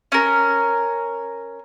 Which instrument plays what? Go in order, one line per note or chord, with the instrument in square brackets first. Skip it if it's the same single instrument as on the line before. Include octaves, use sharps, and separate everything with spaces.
[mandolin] C#4 A#4